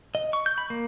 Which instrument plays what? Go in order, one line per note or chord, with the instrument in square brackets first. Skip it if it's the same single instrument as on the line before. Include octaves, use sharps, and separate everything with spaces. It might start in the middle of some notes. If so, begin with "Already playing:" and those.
[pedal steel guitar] D#5
C#6
G6
B5
A#3